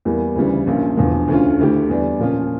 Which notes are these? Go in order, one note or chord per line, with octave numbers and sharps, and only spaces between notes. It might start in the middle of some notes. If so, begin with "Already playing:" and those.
E2 E3 G3 A#3
D2 C#3 E3 G3
A#1 A#2 F3 C#4
E1 E2 D3 F3
D2 D3 A3 C#4 F4
D2 D3 A3 E4 G4
E2 E3 G3 D4
A#2 F3 C#4 F4